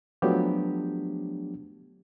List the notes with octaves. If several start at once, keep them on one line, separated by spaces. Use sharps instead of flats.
F3 F#3 A3 B3 D4 G4